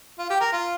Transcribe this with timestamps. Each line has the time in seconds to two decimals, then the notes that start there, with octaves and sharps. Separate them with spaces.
0.19 F4
0.30 G4
0.41 A#4
0.53 F4